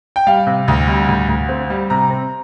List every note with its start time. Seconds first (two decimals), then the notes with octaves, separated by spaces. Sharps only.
0.16 G5
0.27 G3 F5
0.46 C3
0.68 D2
0.88 G3
1.08 D2
1.28 D2
1.49 C4
1.70 G3
1.90 C3 A#5
2.10 C4